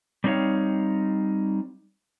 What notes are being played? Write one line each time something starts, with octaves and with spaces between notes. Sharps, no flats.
G3 C4 D#4 C5 C#5 F5